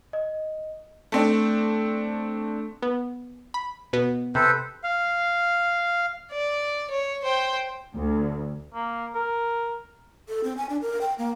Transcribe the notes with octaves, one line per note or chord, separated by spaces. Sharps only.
D#5
A3 C4 D4
B3
B5
B2 B3
C3 A4 B4 C5
F5
D5
C#5
C5 G5
D2
A#3
A#4
A4
C4
G#5
D4
A#4
G5
A#3